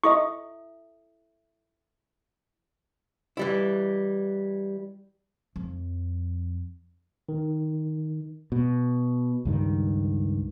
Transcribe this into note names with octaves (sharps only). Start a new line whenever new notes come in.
E4 A4 D#5 E5 C#6
E3 G3 E4
F2
D#3
B2
C#2 G2 D#3